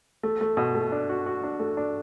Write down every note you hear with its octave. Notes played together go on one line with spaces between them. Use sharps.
A3
A3
B2
A3
D4
F#4
F#4
D4
A3
D4